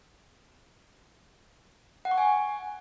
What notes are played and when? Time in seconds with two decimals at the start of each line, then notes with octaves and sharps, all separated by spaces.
2.05 F#5
2.11 C#6
2.18 G#5